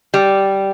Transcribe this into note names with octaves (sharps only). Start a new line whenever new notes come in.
G3